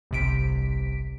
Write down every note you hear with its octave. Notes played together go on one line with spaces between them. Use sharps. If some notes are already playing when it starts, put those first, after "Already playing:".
G1 C2 C3 B6 D7